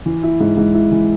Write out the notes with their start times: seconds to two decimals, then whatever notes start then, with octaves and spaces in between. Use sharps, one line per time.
0.06 E3
0.23 E4
0.40 G#2
0.57 G#2
0.75 E4
0.92 E3